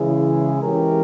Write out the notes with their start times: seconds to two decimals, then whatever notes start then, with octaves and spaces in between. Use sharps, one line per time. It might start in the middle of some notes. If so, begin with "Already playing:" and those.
Already playing: C#3 E3 G#3 E4 G#4
0.61 E3 G#3 C#4 G4 A#4